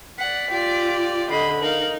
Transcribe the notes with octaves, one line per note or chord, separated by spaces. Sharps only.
D5 F#5 B6
F4 G4 D5 D6
D3 D#5 B5 C7
D#4 A#4 F5 F#7